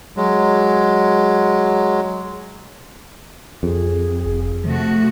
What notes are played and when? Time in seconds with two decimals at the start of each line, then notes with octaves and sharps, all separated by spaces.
0.17 F#3 G#3
3.63 F2 G#4
4.25 F1
4.64 C3 F3 A3 F#4